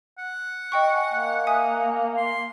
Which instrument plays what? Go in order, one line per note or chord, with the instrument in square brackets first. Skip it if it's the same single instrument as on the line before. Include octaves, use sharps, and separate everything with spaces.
[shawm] F#5
[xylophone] D#5 G5 C#6
G#5
[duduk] A#3
[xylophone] E5 G#5 D#6
[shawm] C6